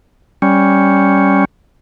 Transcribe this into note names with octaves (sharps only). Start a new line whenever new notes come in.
G3 C#4